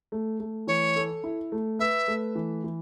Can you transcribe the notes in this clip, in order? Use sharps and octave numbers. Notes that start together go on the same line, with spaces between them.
A3
A3
E3 C#5
A4
E4
A3
B4 E5
A3
E3
E3